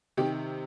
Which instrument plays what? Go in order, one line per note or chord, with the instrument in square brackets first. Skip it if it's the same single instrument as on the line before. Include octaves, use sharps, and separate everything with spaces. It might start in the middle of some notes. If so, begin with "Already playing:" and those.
[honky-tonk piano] C3 D#3 G4